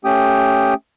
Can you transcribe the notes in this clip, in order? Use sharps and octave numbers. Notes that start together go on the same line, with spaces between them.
A3 C#4 G4 G5 D#6